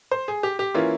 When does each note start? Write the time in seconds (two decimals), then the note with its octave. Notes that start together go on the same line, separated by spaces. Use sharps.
0.11 C5
0.28 G#4
0.43 G4
0.59 G4
0.74 E3 A#3 C#4 E4 F4